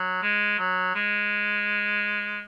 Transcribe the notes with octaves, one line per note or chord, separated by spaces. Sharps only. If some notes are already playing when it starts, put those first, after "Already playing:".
Already playing: F#3
G#3
F#3
G#3